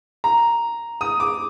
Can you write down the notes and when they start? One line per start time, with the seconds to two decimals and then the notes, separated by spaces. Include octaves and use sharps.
0.24 A#5
1.01 D#6
1.20 D6